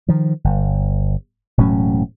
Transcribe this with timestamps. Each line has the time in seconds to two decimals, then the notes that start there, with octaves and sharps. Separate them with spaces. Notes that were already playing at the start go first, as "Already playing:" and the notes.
0.08 D#3 F3
0.44 G1
1.58 E1 A2 F#3 C#4